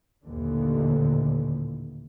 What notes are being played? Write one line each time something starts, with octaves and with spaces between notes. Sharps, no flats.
A1 D#2 A#2 D3 E3